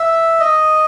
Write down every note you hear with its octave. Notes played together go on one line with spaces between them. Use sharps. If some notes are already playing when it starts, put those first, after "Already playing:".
Already playing: E5
D#5